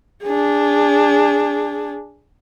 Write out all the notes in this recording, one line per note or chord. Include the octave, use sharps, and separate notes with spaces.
D4 G#4